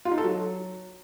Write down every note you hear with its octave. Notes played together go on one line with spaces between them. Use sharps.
F4
D#4
A4
F#3